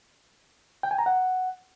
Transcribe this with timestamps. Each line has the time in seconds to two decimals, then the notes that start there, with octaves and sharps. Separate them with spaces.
0.83 G5
0.91 G#5
0.99 A#5
1.06 F#5